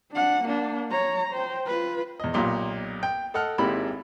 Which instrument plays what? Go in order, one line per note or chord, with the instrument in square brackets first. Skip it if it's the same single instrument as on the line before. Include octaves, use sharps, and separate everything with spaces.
[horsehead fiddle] D4 F#5
A#3 D4
C#5 A#5
C5 G5
F4 B4
[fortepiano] E2 D#5
B1 A#2 G4 C6
G5
A4 D#5 F#5 F6
G#1 G#2 A#3 E4 G4 B5